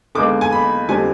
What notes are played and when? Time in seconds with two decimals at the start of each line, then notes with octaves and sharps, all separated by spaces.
0.15 D#2 D3 G#3 B3 D6
0.41 G#5
0.52 B5
0.88 F2 D3 G3 C4 G#5